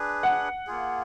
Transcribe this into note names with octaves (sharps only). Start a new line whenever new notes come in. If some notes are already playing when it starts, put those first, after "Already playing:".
Already playing: D4 G#4 B4
F#5
A#3 F4 G#4